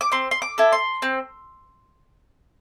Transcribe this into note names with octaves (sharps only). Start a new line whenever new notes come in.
D6
C4 C6
C6
D6
E4 A4
C6
C4